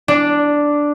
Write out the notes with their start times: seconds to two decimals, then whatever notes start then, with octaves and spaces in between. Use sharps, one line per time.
0.08 D4